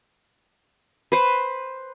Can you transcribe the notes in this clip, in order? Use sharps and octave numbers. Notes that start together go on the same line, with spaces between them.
B4 C5